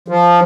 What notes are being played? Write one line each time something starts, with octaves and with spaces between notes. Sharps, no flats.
F3